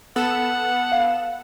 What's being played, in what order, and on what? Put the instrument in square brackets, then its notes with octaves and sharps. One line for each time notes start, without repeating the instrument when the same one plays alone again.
[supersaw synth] B3 A4 E7 [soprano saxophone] F#5
[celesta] F5